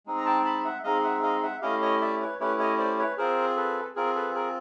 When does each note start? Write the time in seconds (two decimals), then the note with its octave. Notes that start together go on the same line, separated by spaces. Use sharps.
0.06 G#3 C4 D#4 G#4
0.17 A#5
0.25 G5 A5
0.45 A5 B5
0.64 E5 F#5
0.84 G#3 C4 D#4 G#4 D#5 F5
1.03 E5 F#5
1.22 D#5 F5
1.43 E5 F#5
1.61 A3 C#4 E4 G4 D#5 F5
1.82 C#5 D#5
2.01 D5 E5
2.21 B4 C#5
2.40 A3 C#4 E4 G4 B4 C#5
2.59 C#5 D#5
2.79 C5 D5
2.99 B4 C#5
3.17 C4 F4 G#4 A#4 C5
3.57 A4 B4
3.96 C4 F4 G#4 A#4
4.15 A4 B4
4.35 G#4 A#4